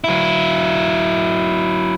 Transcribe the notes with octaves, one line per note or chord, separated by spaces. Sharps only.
F#3 E4